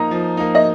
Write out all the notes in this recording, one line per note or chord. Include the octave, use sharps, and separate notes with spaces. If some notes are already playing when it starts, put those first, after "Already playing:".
Already playing: F3 A#3 D#4 A#5
F3
A#3 D#4
D#5